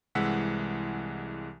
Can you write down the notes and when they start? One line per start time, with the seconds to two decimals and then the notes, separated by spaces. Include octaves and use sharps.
0.15 C2 E3 G#3 F#5 E6 B6